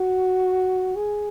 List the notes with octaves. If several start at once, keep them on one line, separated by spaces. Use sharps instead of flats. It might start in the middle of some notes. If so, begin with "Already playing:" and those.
Already playing: F#4
G#4